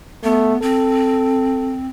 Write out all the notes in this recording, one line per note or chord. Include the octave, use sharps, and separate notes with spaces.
A3 B3
C4 A4